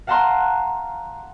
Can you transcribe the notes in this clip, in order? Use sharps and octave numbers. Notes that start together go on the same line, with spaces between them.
F5 F#5 A5 A#5 C6 F#6